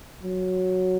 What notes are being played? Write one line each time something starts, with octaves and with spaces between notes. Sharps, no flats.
F#3